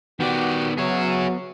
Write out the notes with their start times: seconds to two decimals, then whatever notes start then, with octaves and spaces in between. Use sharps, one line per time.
0.20 D#3 B3 F#4 G4 D5
0.78 F#3 G#4 C#5 E5 F#5